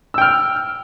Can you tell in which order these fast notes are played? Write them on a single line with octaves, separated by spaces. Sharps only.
E6 G5 F6